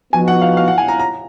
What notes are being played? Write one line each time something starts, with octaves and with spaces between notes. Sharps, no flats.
F3 B3 D#4 F#4 G#5
F#5
F5
F5
F#5
G#5
A#5
A#5